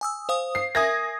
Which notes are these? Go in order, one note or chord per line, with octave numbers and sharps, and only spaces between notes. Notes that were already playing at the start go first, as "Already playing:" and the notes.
G#5 D#6 E6
C5 F5 D#6
C7
A#4 E5 G#5 D#6 G#6 A#6